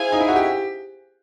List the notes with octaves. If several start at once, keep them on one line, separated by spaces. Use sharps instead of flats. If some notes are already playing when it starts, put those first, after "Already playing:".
Already playing: E4 G#4 C5 F5 G#5
D#4
E4
F#4
G4